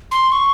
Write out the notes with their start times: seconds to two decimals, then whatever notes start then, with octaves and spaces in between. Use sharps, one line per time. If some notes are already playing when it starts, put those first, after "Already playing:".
0.11 C6
0.32 C#6